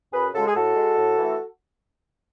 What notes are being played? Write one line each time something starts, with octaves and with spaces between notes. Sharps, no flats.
F#2 G#4 B4
C#3 G#3 F#4 A4
G#4
A2 F#4 A4
G#3
A2
E3 A3